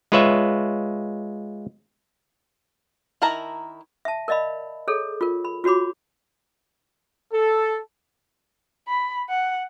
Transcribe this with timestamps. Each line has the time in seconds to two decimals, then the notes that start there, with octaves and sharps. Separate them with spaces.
0.12 G#3 F4 B4 C#5 E5
3.22 D#3 E4 A#4 A5 A#5
4.05 E5 A5
4.28 A#4 D5 D#5 F5 B5
4.88 G#4 A4 C#5
5.21 F4 A#4
5.45 B5
5.64 F4 F#4 C#5 B5 D6
7.33 A4
8.88 B5
9.29 F#5